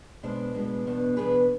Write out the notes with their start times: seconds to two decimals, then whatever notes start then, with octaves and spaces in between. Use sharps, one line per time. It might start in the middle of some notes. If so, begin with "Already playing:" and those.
0.23 B2 G#3 B3 D4 A4 C5
0.54 B2 G#3 B3 D4
0.85 E2 B2 B3 D4
1.16 E2 B2 B3 D4 G#4 B4